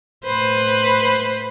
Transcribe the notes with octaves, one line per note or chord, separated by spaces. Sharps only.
A2 B4 C5